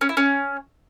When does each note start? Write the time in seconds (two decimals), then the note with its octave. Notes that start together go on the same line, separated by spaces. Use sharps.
0.01 C#4
0.09 E4
0.17 C#4